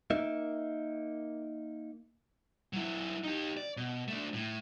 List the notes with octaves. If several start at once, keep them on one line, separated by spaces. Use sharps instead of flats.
A#3 D#4 E5
F#3 E4
D#4 G4
D5
B2
A3 D4
A2